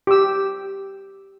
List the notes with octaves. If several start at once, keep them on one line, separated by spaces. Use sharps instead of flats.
G4 E6